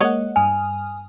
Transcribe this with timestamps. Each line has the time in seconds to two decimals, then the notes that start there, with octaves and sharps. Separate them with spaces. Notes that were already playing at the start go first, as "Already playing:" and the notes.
0.01 G#3 A#3 C#5 D#5 F#5
0.36 G2 G#5 D#6 F6